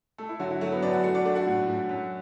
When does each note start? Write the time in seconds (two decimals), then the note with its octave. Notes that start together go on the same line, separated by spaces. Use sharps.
0.18 A3 A4
0.29 E4
0.39 D3 F#3 F#4
0.51 E4
0.61 F#3 A3 F#4
0.72 B3 B4
0.82 F#2 D4 D5
0.93 F#4 F#5
1.04 A3 F#4 F#5
1.14 D4 D5
1.25 A3 D4 D5
1.35 F#4 F#5
1.46 A2
1.68 A2
1.89 F#2